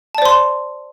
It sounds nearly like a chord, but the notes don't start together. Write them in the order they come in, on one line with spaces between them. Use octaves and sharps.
A5 D5 C5 C6